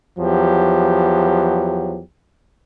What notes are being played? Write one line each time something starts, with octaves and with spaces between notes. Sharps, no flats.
E2 F3 F#3 G4